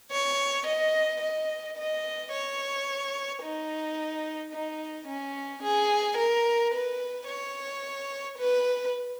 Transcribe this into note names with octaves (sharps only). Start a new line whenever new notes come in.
C#5
D#5
D#5
D#5
C#5
D#4
D#4
C#4
G#4
A#4
B4
C#5
B4